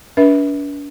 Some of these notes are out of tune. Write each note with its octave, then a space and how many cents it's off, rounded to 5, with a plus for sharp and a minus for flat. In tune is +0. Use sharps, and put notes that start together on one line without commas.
D4 -40 B4 -35 E5 -30